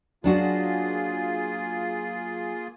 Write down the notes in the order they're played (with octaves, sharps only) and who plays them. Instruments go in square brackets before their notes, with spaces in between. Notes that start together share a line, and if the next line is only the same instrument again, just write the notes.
[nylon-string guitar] F#3 D4 F#4 [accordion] A#3 F4 G#4